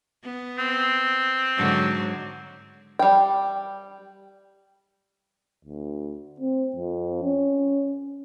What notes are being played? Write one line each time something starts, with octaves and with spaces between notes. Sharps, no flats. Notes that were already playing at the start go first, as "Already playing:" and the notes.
B3
C4
G#2 D3 F#3
G3 G5
D2
C4
F2
C#4